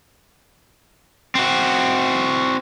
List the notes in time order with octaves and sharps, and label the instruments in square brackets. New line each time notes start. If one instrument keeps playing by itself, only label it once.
[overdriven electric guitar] C4 F#4